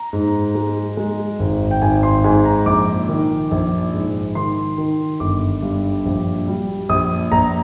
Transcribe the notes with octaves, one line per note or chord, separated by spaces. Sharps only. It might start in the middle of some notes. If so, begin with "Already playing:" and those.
Already playing: A#5
G#2
G#3
G#3
G#1
G5
G#1 G#5
C6
G#2 G#5
A#5
A#1 D6
D#3
A#1
G#2
D#3 C6
D#3
G1 D6
G2
A#1
G3
A#1 D#6
A#1 A#5